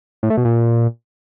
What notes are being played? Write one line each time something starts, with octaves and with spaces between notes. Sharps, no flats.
A2
A3
B2
A#2